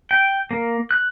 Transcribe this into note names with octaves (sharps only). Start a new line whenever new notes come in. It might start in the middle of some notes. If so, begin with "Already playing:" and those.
G5
A#3
F#6